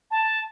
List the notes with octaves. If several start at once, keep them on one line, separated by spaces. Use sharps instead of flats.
A5